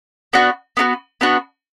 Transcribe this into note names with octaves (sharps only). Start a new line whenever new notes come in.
B3 D4 F#4
B3 D4 F#4
B3 D4 F#4